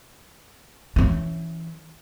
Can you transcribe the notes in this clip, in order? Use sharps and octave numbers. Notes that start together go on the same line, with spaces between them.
E3 C#4